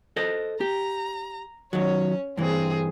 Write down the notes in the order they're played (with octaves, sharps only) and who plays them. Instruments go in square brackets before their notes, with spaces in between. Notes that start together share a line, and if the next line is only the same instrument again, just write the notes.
[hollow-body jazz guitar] A4 C5 D#5
[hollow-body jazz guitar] G4 [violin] A#5
[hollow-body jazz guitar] D#3 F#3 [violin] C#4 C#5
[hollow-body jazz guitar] G2 E3 [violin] C4 G#4